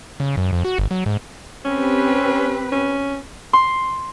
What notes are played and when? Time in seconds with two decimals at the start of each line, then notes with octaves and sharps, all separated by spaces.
0.20 C#3
0.37 F#2
0.53 F2
0.65 F#4
0.78 G1
0.91 F#3
1.06 G#2
1.65 C4 C#4 G4 B4
2.72 C#4
3.53 C6